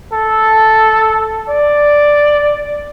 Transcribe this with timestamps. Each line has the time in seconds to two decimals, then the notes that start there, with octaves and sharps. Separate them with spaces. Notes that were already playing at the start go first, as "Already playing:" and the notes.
0.13 A4
1.49 D5